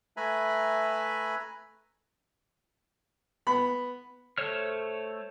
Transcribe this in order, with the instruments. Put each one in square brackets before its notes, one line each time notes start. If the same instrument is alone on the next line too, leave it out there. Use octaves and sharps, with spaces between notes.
[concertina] A3 B4 E5 G#5 A#5 B5
[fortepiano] B3 B5
[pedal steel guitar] A3 A4 C5 C#5 F6